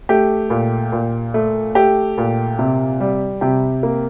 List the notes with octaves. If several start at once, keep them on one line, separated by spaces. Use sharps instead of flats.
A3 G4
A#2
A#2
A3
A3 G4
A#2
C3
G3
C3 G4
A#3